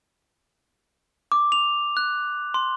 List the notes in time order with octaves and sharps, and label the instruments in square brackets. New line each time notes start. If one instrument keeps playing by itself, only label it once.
[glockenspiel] D6
F7
F#6
C6